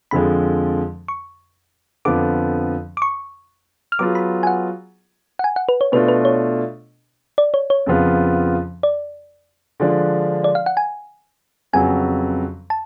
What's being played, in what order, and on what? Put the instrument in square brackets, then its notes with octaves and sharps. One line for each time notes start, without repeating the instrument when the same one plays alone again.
[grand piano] F2 D3 F3 G#3 [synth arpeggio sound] B5
[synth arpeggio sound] C#6
[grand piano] F2 D3 F3 B3 [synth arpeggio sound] D6
[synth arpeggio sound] D6
C#6
F6
[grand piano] F#3 B3 F4 G#4 [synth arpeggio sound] D6
[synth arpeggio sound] B5
G#5
F#5
F#5
G#5
F#5
B4
C#5
[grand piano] B2 A3 D4 F4 [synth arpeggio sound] B4
[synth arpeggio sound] B4
C#5
D5
C#5
C#5
[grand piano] F2 C#3 F3 B3 F4
[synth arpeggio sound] D5
[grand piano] D3 F3 G#3 D4 F4
[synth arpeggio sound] D5
F5
F#5
G#5
[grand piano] F2 C#3 F#3 B3 F#4 [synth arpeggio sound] G#5
[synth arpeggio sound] A5